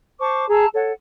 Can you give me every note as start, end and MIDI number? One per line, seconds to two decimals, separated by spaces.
0.19 0.45 72
0.19 0.45 81
0.19 0.45 85
0.19 0.45 86
0.49 0.66 68
0.49 0.66 81
0.49 0.66 82
0.49 0.66 88
0.74 0.91 69
0.74 0.91 73
0.74 0.91 78